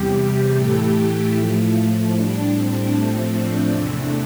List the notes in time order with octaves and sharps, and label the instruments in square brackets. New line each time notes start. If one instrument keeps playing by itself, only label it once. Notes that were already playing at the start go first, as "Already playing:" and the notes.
Already playing: [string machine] E2 C3 G3 G4
G4
A2 E3 A3
A2 F3 A3
A2 G3 D4
C4
A2 F3 A3
D4
E2 C3 E3 A3